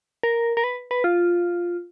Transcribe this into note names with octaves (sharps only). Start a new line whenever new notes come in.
A#4
A#4
B4
B4
F4